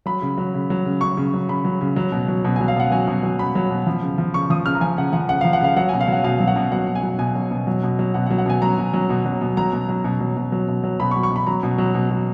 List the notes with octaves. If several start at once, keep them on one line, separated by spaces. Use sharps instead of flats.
F#3 B5
C#3
F#3
C#3
F#3
C#3
F#3 C#6
C#3
F#3
C#3 B5
F#3
C#3
F#3
B2
F#3
B2
F#3 G#5
F5
B2 F#5
F#3 G#5
B2
F#3
B2 B5
F#3
B2
F3
C#3
F3
C#3 C#6
F3 D#6
C#3 F6
A#5
F3 G#5
C#3 F#5
F3 F#5
C#3 F#5
F3 F5
F#5
C#3 F5
F#3 F#5
B2 G#5
F5
F#3 F#5
B2 F5
F#3
F#5
B2
F#3 F#5
B2
G#5
F#3
B2 G#5
F#3
B2
F#3
B2
F#3
B2 F#5
F#5
F#3
F#5
B2 G#5
F#3 A#5
B2
F#3
B2
F#3
B2
F#3 A#5
B2
F#3
B2
F#3
B2
F#3
B2
F#3
B2 B5
C#6
F#3
C#6
B2 B5
F#3 A#5
B2
F#3
B2
F#3